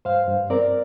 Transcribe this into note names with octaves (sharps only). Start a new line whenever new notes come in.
G2 C5 F5
G2
C4 A#4 D5